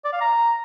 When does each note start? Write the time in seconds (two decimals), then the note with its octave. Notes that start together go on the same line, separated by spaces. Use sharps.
0.05 D5
0.13 F5
0.21 A#5